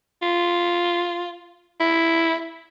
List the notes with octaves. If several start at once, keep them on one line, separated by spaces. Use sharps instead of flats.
F4
E4